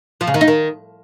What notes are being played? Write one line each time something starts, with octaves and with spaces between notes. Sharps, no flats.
F3
C#3
D#3
D#4
D#3